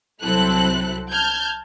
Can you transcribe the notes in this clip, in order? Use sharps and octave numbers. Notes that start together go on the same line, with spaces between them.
C2 F#3 C4 E4 A4 F#6
A5 F6 G6 G#6